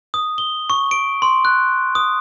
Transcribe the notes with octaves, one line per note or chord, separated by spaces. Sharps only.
D#6
G7
C#6
D7
C6
F#6
D#6